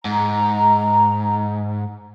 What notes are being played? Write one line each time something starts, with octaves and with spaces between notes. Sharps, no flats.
G#2 A#5